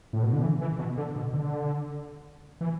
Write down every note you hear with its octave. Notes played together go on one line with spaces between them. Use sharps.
A2
B2
D3
E3
E3
B2
D3
B2
D3
E3